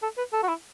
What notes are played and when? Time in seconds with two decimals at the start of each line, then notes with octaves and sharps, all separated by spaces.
0.03 A4
0.18 B4
0.33 A4
0.43 F#4
0.48 E4